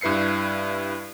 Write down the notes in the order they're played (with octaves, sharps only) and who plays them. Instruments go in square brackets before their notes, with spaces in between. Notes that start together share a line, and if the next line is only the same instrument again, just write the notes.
[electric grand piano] G2 E4 B4 C7 C#7